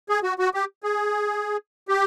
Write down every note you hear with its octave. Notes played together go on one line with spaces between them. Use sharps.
G#4
F#4
F#4
G4
G#4
G4